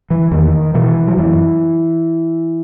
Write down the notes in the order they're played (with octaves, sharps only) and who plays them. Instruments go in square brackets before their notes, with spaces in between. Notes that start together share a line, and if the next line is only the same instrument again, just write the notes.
[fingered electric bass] E3
E2 D#3
B2 E3
F#3
F#2 E3